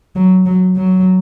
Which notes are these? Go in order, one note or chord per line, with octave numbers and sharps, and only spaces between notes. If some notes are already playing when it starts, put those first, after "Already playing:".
F#3
F#3
F#3